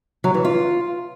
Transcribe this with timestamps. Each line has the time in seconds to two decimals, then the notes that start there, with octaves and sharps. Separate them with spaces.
0.24 F#3
0.34 E3
0.45 F4